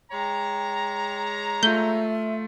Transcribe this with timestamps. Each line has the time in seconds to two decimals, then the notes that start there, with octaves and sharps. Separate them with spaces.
0.12 G#3 C#5 G5 A#5
1.63 A3 F4 E5 G6